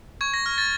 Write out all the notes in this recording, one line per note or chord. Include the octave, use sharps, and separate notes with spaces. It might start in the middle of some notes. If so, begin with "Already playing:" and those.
C#6 G#6
A#6
F6 A#6
A6